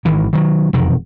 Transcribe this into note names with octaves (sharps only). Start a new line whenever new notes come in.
G#1 D#3 E3
D#3 F#3
E1 F2 C3 D#3